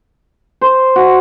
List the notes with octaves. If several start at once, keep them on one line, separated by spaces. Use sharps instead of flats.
C5
F#4